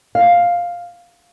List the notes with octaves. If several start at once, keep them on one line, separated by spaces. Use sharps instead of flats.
F5